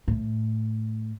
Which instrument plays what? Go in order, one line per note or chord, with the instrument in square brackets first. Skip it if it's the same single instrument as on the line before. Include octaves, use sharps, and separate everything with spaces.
[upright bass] A2